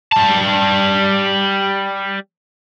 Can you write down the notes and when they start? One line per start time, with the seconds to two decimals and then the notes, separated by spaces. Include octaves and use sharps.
0.12 G3 A5